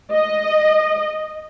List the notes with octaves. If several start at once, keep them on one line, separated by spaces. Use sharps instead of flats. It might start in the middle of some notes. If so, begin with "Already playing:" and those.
D#5